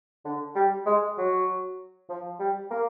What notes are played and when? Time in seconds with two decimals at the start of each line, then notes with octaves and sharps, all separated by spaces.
0.25 D3
0.55 G3
0.86 G#3
1.18 F#3
2.09 F3
2.40 G3
2.71 A#3